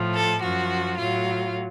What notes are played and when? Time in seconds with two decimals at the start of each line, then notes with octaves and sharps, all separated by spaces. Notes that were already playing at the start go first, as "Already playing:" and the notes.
Already playing: A2 F3
0.14 A4
0.42 F#2 F3 F#4
0.99 A2 F#3 F4